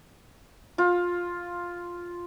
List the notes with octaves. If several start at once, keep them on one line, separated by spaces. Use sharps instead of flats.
F4